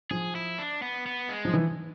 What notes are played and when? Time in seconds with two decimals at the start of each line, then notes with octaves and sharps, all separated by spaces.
0.11 F3 G#4
0.35 E4
0.59 D4
0.82 B3
1.06 B3
1.29 G#3
1.45 F3
1.54 E3